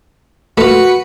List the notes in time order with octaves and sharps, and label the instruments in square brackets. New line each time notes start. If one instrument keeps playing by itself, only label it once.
[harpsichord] A3 F4 [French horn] F#4 [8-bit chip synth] B4 B6 C#7